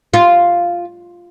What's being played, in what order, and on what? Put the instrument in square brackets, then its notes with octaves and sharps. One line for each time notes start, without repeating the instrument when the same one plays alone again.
[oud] F4